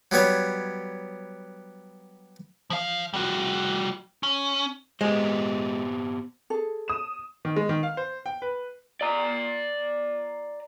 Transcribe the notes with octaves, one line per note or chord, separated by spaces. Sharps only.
F#3 G3 B3 C#5
F3 F5
G3 F#4
C#4
G#3 B3 G4 C5
G#4 A4
D#6 E7
D#3
G#3
D#3
F5
C5
G5
B4
D5 A#5